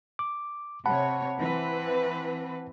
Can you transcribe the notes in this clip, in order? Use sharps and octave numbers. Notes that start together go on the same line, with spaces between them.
D6
C3 C#5 F#5 A5 B5
E3 C4 B4